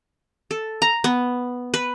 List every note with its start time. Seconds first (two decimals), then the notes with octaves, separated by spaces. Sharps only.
0.51 A4
0.82 A#5
1.04 B3
1.74 B4